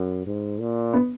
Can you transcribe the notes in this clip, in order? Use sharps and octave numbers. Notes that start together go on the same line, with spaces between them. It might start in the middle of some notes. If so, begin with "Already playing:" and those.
Already playing: F#2
G#2
A#2
B3